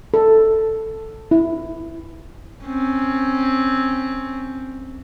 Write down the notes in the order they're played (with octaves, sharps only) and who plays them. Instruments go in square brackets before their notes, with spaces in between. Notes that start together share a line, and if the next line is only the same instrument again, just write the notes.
[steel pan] A4
E4
[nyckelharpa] C4 C#4